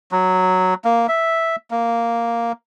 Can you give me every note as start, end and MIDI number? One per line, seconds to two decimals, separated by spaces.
0.12 0.74 54
0.84 1.07 58
1.08 1.56 76
1.71 2.52 58